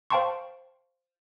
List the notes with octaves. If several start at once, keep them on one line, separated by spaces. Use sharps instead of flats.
C5 F5 G5 A5 C6 C#6